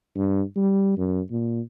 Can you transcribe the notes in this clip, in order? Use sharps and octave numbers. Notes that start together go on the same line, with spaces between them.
G2
G3
F#2
A#2